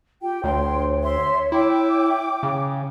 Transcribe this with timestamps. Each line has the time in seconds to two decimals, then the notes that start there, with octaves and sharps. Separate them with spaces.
0.22 F4 G4 G5
0.44 D2 C#5 G5 C6
1.02 E5 C6
1.52 E4 G5 D6
2.43 C#3